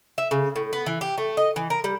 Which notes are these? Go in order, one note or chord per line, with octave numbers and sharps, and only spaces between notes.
E5
C#3
A2
B3
E3
G4
A3
D#5
E3
A#4
G3